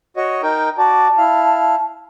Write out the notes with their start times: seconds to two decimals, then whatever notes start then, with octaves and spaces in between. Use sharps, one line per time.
0.17 F#4 C#5 D#5
0.43 D#4 A#4 G5
0.78 F#4 D5 A5
1.18 E4 F5